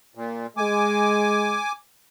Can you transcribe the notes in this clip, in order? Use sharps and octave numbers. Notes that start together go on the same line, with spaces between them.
A#2
G#3 G#5 D6